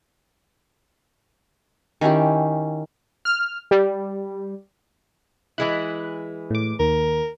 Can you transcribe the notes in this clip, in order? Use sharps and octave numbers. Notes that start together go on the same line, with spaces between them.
D#3 C#4 E4 G4
F6
G3
E3 G#3 E4 F#6
A2 D6
D#2 A#4